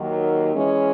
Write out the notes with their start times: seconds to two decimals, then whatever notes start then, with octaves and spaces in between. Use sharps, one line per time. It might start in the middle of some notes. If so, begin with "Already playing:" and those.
Already playing: D#2 D#3 F#3
0.54 E3 G#3 C#4